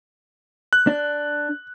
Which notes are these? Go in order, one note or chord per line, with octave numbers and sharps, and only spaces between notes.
F#6
D4